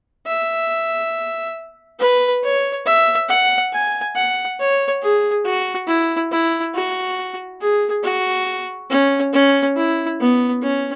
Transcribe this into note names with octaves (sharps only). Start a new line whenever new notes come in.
E5
B4
C#5
E5
F#5
G#5
F#5
C#5
G#4
F#4
E4
E4
F#4
G#4
F#4
C#4
C#4
E4
B3
C#4